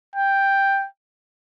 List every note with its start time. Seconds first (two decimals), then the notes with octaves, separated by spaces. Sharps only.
0.16 G5